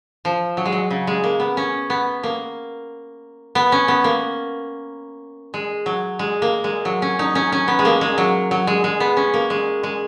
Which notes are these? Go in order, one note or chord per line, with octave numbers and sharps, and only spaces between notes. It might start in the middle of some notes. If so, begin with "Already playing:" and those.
F3
F#3
G#3
F#3
C#3
G#3
A#3
B3
C#4
B3
A#3
B3
C#4
B3
A#3
G#3
F#3
G#3
A#3
G#3
F#3
C#4
D#4
C#4
C#4
B3
G#3
A#3
G#3
F#3
F#3
G#3
G#3
B3
C#4
A#3
G#3
G#3